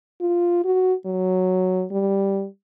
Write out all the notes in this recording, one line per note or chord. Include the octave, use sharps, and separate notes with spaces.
F4
F#4
F#3
G3